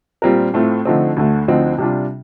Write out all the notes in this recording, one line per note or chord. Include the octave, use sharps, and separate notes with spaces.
A#2 G3 C4 F4 A#4
A2 A3 C4 F4
D3 F3 A3 C4 D#4
D2 D3 A3
D2 D3 F3 C4 D#4
C3 G3 D4 F4